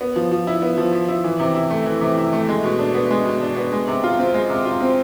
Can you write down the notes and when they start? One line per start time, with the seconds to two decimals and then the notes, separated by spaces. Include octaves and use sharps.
0.01 B3
0.16 F3
0.31 F3
0.47 E4
0.62 B3
0.78 F3
0.93 F3
1.08 E4
1.24 E3
1.40 C3
1.55 E4
1.70 A3
1.86 E3
2.01 C3
2.18 E4
2.33 A3
2.49 G#3
2.64 B2
2.79 D4
2.94 B3
3.11 G#3
3.25 B2
3.41 D4
3.56 B3
3.72 G#3
3.88 C3
4.04 F4
4.19 C4
4.34 G#3
4.50 C3
4.66 F4
4.81 C4